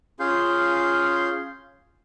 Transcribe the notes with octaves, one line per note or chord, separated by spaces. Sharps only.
C#4 F4 G#4 F5 C6 G6